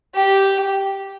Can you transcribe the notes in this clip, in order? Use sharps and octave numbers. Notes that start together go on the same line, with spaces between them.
G4